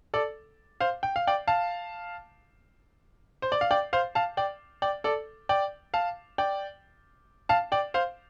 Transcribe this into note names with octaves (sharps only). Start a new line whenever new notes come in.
A4 D5
C5 F5
G5
F5
D5 G5
F5 A5
C5
D5
F5
D5 G5
C5 F5
F5 A5
D5 G5
D5 G5
A4 D5
D5 G5
F5 A5
D5 G5
F5 A5
D5 G5
C5 F5